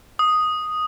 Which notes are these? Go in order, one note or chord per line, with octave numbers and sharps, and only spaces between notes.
D#6